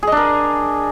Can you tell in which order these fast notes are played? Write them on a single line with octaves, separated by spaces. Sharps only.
G#4 D#5 D4 A#4